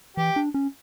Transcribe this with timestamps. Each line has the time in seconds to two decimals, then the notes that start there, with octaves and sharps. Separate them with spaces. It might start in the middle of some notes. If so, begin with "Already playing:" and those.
0.17 E3 G4
0.36 D4
0.54 C#4